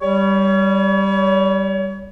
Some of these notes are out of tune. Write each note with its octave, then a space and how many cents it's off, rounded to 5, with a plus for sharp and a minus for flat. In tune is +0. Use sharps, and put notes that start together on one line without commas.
G3 +0 C#5 +35